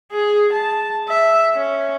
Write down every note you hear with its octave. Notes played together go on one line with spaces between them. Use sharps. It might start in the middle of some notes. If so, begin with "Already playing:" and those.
G#4
A5
E5
C#4